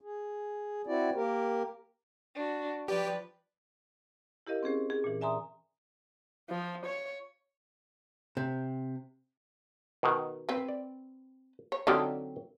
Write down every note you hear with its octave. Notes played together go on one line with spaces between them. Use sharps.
G#4
C4 E4 F#4 D5
A#3 G4 A#4
D4 F#4
F3 G4 B4 D5
E4 G4 A#4 D#5 F5
C4 C#4 G#4 C5
G#4
A#2 E3
D5 E5 G#5 A#5 C6 D#6
F3
C#5
C3
B2 D#3
C4 B4
D5
C#5
D3 F#3 C4 D#4 F4 G4